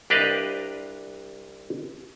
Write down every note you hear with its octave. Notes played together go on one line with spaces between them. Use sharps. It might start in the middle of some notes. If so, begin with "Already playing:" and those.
C2 D4 G4 B4 D#5 F5